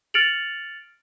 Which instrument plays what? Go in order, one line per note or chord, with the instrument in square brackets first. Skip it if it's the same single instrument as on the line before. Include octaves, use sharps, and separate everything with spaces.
[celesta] F6 A6 C#7 D7 F7 F#7